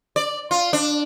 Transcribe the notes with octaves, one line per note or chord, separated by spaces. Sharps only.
D5
F4
D4